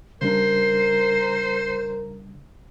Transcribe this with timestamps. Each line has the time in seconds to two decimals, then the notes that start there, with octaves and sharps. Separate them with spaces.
0.22 C#3 G3 D4 A#4 C5 C7